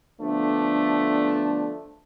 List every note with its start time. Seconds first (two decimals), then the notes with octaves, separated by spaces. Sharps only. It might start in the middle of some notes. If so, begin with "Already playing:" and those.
0.21 D3 F3 A3 B3 D4